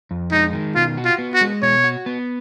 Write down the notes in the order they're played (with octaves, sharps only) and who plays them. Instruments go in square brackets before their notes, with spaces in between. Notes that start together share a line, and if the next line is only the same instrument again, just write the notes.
[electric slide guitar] F2
[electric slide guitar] G#3 [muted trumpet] D#4
[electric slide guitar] D#3
[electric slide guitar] B2 [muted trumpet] F4
[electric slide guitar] F#4
[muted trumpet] F4
[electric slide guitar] B3
[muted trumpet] F#4
[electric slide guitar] G#3
[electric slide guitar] B2 [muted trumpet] C#5
[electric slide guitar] F#4
B3